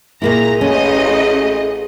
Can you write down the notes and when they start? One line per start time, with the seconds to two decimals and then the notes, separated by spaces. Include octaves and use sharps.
0.22 A#2 A#3 E4 G#4 A#5 A#6
0.61 A1 A3 C#4 D#5